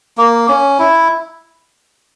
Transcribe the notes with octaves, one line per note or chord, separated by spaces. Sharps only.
A#3
C#4
E4